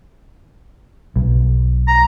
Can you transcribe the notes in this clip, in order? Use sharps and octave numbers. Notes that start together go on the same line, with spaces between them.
B1
A#5